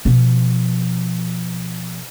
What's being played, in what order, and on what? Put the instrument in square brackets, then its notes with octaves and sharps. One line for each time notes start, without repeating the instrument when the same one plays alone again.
[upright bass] B2 F3